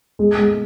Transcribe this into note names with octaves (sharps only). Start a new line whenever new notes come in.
G#3
G#3